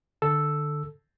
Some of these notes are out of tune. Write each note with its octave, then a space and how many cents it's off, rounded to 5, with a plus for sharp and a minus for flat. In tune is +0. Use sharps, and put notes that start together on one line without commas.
D3 +20 A4 +0 E6 +0